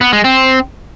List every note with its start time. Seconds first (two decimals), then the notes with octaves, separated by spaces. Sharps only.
0.01 B3
0.13 G#3
0.24 C4